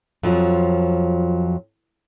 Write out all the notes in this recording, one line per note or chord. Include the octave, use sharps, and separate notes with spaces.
F2 F3 F#3 F4